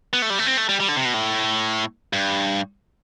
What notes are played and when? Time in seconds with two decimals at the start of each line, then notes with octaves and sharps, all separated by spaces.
0.13 B3
0.22 A3
0.30 G3
0.39 A3
0.47 C4
0.57 A3
0.69 G3
0.80 G3
0.88 D3
0.97 C3
1.05 B2
1.14 A2
2.13 G2